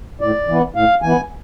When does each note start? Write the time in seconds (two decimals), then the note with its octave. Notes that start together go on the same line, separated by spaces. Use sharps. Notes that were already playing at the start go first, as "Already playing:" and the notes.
0.21 A2 D5
0.48 E3 B3
0.75 A2 F5
1.02 E3 B3 G#5